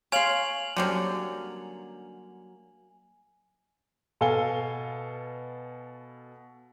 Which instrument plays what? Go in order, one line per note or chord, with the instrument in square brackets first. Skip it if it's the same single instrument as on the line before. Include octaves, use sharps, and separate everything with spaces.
[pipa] C#5 [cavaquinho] F5 C6 [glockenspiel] G#5 F7 F#7
[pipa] D3 C4 C#4 [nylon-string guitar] F#3 G3 A#3
[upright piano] B2 A4 F5 G#5 G7